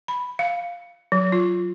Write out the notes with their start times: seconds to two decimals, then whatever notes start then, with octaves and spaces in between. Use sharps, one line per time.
0.08 B5
0.39 F5
1.12 F#3
1.32 F4